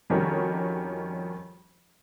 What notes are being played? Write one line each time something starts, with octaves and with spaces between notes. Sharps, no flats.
F2 D#3 G3 C#4 F#4 A#4